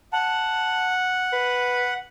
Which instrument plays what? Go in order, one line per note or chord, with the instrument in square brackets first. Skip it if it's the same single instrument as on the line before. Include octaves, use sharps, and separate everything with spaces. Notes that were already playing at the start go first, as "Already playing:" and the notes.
[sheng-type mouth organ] F#5 [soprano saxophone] A5
[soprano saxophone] B4